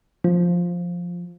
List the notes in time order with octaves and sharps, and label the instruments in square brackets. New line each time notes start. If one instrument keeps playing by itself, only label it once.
[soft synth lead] F3